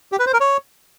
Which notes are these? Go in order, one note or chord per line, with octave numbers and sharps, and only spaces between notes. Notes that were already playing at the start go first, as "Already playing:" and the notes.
G4
B4
C5
A#4
C#5